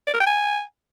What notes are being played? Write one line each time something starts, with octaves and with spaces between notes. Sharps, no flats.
D5
A#4
G5
G#5